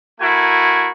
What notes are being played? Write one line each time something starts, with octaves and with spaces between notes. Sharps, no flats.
A3 E4 F#4 A#4 G#5